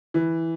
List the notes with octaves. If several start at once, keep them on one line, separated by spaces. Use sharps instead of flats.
E3